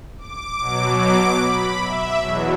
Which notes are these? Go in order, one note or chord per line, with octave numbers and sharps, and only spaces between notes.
D6
B2 F#3
D6
B5
E5
E2 B2 F#3